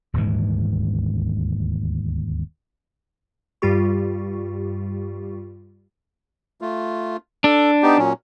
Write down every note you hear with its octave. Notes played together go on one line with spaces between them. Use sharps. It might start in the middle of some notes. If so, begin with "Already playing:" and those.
D#1 D2 G#2 E3
G2 G3 F4 G4 C#6
A3 F4
D4 A4
B3 D#4 G4
A#2 F#3 C#4